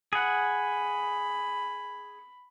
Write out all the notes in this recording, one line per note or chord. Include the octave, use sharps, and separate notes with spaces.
G#4 F#5 B5